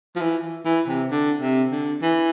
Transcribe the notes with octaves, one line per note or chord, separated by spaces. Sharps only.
F3
E3
E3
C3
D3
C3
D3
E3